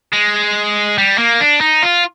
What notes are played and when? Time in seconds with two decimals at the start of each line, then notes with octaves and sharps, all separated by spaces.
0.13 G#3
0.98 G3
1.18 A#3
1.41 D4
1.61 D#4
1.83 F4